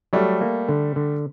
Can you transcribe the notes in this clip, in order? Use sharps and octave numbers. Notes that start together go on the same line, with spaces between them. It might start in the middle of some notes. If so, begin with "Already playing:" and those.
F#3 G3 A3
A#3
D3
D3